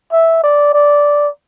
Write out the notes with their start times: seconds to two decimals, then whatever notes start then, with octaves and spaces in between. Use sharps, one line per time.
0.12 E5
0.43 D5
0.73 D5